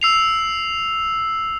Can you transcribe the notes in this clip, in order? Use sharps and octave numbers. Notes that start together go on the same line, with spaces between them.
E6 C7 F7